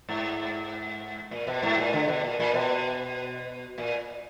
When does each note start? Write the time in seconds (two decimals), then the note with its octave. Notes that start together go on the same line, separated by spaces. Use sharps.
0.09 G#2
1.31 A#2
1.47 B2
1.62 G#2
1.78 A#2
1.93 D3
2.08 B2
2.24 A#2
2.40 A#2
2.54 B2
3.78 A#2